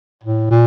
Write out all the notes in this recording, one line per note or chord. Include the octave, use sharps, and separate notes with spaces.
A2
A#2